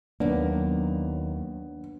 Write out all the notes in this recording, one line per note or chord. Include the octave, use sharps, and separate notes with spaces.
D#2 F#3 A#3 B3 D4